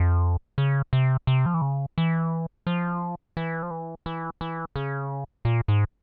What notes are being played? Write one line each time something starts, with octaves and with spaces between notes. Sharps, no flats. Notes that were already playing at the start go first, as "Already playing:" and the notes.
Already playing: F2
C#3
C3
C3
F3
E3
C#3
E3
F3
E3
F3
E3
E3
E3
C#3
A#2
G#2